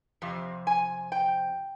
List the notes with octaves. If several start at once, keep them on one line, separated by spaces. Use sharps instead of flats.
F2 C3
G#5
G5